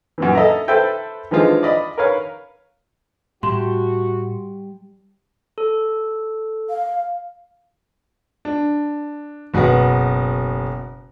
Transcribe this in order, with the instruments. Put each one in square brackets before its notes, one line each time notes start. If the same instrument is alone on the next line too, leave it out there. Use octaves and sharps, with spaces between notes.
[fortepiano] F#2 A#2 E3
A4 D#5 E5 A#5
A4 B4 C5 E5 G5
D3 E3 F3 G#3 F4
D5 D#5 B5
A#4 B4 C#5 F5
[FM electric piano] A2 [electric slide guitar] G3 G4 A5 [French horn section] F#4 [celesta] C6
[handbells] A4
[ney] F5
[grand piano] D4
F#1 B2 F#4 B4 F#5